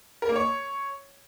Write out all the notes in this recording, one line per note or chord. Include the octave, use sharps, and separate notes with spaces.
A#4
A#3
C#5